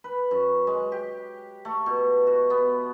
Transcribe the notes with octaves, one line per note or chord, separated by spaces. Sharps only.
B4
F#2
G#3
G4
A3
B2
F#4
B3